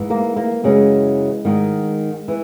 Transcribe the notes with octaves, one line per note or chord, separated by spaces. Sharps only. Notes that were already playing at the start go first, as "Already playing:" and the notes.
Already playing: G#2 E3
A#3
A#3
F#2 C#3 E3 G#3
G#2 D#3
E3